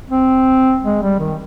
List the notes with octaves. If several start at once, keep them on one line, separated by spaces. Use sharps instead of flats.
C4
G#3
G3
D#3